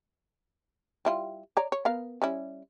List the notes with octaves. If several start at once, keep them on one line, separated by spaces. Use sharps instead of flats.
G3 E4 F4
C#5 D5 A#5
C#5
B3 A#4 F5
G3 C#4 E4